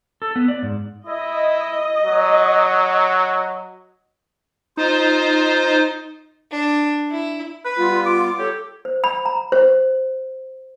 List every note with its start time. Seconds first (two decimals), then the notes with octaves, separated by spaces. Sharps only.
0.22 A4
0.36 B3
0.48 D5
0.63 G#2
1.07 E4 D#5
2.04 F#3
4.77 D#4 F4 C5
6.52 D4
7.11 E4
7.65 B4
7.78 G3 B3 F4
8.06 D6
8.39 G4 A4 C#5
8.85 C5
9.04 B5
9.25 A#5
9.52 C5